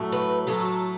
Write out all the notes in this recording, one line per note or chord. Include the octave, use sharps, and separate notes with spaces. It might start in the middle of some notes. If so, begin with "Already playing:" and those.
Already playing: A2 F#3 A3
B4
A2 F#3 A3 A4